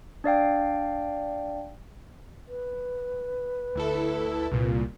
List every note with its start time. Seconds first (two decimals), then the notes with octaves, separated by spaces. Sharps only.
0.24 D4 D5 F5 G5
2.48 B4
3.75 D2 E4 A4
4.52 C2 A#2